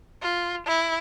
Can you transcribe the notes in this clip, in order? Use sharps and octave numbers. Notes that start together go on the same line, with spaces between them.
F4
E4